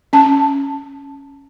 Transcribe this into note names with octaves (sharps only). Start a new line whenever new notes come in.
C#4 A5